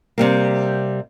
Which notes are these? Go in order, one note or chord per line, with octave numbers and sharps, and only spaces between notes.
C3 G3 A#3